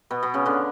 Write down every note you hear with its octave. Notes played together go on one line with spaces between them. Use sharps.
B2 B3
B2 B3
C#3 C#4
D3 D4